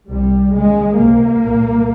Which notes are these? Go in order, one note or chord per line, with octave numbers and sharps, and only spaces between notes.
C2 C3 G3
D#2 C#3 G#3
C#2 C3 A#3
C2 A#2